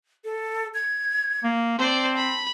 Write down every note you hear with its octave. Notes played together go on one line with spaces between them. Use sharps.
A4
G#6
A#3
C4 C5 D5 A5
B5